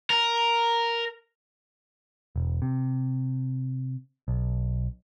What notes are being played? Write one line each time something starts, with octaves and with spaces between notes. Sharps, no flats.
A#4
E1
C3
B1